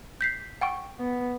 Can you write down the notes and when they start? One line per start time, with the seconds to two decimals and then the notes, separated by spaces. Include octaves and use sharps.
0.21 G6 B6 C7
0.61 F#5 G5 C#6
0.99 B3